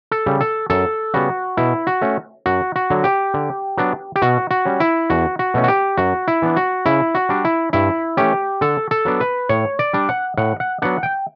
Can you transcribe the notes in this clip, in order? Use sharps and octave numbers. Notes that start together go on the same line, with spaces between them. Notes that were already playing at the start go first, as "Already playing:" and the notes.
A4
C#3 G3
A4
F#2 A4
C#3 G3 B3 F#4
B2 E4
F#4
A3 C#4
F#2 F#4
F#4
D3 F#3
G4
D3
F#3 B3 D4
G4
B2 F#4
F#4
G3 C#4
E4
E2 F#4
F#4
B2 A3 C#4
F#4
G4
F#2 F#4
E4
E3 B3 D4
F#4
C#3 E4
F#4
G3 D4
E4
G2 E4
E3 A3 C#4 G4
D3 A4
A4
F#3 B3 D4
B4
A2 C#5
D5
G3 D4
F#5
A2 F#5
F#5
F#3 B3 D4 F#5
G5